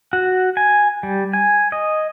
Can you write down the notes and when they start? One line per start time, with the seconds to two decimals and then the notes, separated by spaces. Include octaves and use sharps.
0.13 F#4
0.57 G#5
1.03 G3
1.33 G#5
1.72 D#5